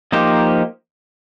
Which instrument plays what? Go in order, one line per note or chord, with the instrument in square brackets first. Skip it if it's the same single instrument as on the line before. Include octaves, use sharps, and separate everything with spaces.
[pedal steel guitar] F3 A#3 D#4 G4 C5